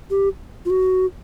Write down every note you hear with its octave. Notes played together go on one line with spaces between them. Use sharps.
G4
F4
F#4